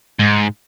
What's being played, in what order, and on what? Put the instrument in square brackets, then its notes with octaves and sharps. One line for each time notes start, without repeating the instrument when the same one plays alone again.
[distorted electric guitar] G#2